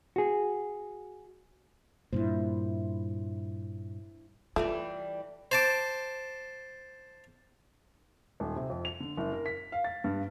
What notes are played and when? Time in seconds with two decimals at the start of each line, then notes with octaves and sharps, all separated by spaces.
0.16 F#4 G#4
2.13 G2 A#2 E4 C5
4.56 E3 G3 A3 D4 F4
5.51 C5 A5 D6
8.40 D#1
8.56 C3
8.70 F2
8.85 F7
9.00 D3
9.17 F#1
9.33 A#4
9.46 B6
9.72 F5
9.84 A6
10.04 G2